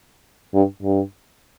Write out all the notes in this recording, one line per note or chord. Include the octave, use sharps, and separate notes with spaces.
G2
G2